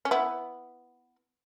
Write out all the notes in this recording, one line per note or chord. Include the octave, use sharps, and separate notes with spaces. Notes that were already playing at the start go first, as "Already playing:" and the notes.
C#4
B3 E4